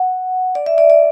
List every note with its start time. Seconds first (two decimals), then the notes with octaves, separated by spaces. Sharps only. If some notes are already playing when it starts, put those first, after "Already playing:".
Already playing: F#5
0.55 D5
0.66 E5
0.78 D5
0.90 D5